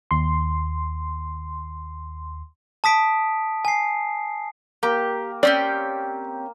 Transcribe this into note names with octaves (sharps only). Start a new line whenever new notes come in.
D#2 C6
A5 D#6 B6 D7
G#5 C7
A#3 G4
C4 C#4 G4 D5